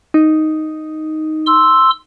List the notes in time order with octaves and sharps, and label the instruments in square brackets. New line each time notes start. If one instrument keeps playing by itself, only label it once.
[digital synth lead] D#4
[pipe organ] C6 E6